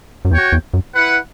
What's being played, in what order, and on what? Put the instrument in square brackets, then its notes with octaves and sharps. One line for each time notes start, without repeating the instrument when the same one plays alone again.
[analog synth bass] F#2
[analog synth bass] E2 [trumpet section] F#4 C#5 G5
[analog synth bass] E2
F#2
[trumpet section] E4 B4 F#5